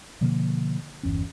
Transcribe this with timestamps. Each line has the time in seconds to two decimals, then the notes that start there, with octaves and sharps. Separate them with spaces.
0.21 B2 D3 F3 A#3
1.03 G1 E2 C#4